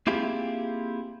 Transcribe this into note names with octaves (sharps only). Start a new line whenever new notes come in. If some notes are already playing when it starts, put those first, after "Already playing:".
A#3 C4 E4 F4 G4 G#4